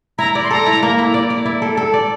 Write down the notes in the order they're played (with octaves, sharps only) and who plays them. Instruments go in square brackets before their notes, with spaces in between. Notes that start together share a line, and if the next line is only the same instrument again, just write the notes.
[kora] E4 [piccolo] A#5
[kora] D5
[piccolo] C6
[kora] A4 [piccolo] A#5
[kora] E4
A#3
E4
D5
D5
E4
A4
A4
D5